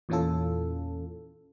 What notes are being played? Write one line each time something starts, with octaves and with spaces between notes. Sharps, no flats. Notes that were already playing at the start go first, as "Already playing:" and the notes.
E2 A#2 E3 C#4 F4 A4